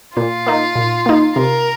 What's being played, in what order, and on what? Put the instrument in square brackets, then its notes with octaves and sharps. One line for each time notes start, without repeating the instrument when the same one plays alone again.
[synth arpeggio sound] A#2 [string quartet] F4
[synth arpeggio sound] A#3 D#4
A#2
A#3 D#4
[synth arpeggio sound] C3 [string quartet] A#4